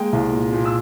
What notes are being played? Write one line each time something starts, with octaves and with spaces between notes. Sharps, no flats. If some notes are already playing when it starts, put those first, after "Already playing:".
Already playing: G#3 A#3 G5
C2
A#2
A#2
E6